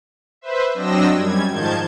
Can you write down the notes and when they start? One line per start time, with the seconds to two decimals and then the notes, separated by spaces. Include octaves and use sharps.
0.41 B4 C5 E5
0.74 F#3 C4 D4 D#5 E6 A#6
1.13 F#2 G3 G#6
1.50 G#2 D#3 F3 A5 G6 G#6